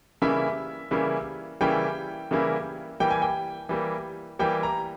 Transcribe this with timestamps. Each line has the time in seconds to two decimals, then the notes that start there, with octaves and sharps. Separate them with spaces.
0.22 C#3 E3 G3 A#3 E4 E5
0.91 C#3 E3 G3 A#3 E4
1.61 C#3 E3 G3 A#3 E4 G5
2.31 C#3 E3 G3 A#3 E4
3.00 E3 G3 A#3 G5
3.11 G#5
3.22 G5
3.69 E3 G3 A#3
4.39 E3 G3 A#3 G5
4.63 A#5